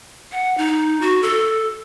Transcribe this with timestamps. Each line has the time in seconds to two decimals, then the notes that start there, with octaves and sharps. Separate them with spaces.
0.32 F#5
0.58 D#4
1.01 F#4
1.23 A4